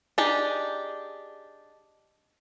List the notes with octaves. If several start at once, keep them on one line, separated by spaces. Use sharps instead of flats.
D4 D#4 G4 G#4